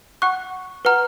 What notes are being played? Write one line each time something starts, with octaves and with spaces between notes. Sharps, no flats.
F#5 C#6 F#6
B4 F#5 A#5 F6